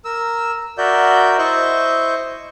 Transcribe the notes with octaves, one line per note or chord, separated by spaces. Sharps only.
A#4 E6
F#4 A#4 D5 E5 G6
E4 C5 D#5 C#6 G6